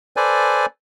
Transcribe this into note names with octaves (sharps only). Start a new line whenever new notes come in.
A4 B4 C5 D5 G#5